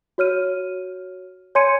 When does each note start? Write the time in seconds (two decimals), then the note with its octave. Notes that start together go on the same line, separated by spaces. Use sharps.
0.18 F#4 C#5 F6 D#7
1.55 C#5 G#5 C6 G#6 C#7 D#7